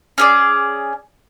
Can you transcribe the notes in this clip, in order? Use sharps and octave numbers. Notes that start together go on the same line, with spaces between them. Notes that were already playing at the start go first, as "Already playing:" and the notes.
C#4 G#4 D5